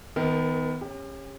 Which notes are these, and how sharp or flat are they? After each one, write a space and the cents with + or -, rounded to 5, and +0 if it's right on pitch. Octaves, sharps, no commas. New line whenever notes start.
D#3 +25 B3 +25 A#4 -10
C#4 -20 G4 +35